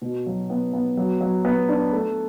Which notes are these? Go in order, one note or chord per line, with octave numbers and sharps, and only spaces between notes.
B2
F#3
B3
B3
F#3
F#3
B3
D4
A3